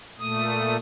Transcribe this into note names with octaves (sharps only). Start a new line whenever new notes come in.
A#2 A3 D#6